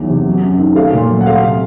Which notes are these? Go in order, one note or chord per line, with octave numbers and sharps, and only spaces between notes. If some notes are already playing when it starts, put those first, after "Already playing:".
Already playing: E2 D#3 F#3
C3
F#3
F#2
D#3
A3 F5
A#2
F#3
F#5
A3 F5
C3